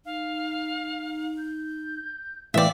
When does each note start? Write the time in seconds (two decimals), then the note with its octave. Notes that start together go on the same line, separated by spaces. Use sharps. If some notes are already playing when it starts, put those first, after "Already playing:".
0.05 D#4 F5
1.38 G6
2.54 A2 E3 D5 E5 F5 G5